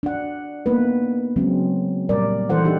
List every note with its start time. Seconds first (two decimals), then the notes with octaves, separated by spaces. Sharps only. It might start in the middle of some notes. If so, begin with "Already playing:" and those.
0.03 D4 F#5
0.66 A#3 B3 D#4 B4
1.36 C#3 F#3 G#3 C4 C#4
2.09 A#2 G3 A#4 D5
2.50 E3 E4 A4 C5 F#5
2.65 D4 D#4 G4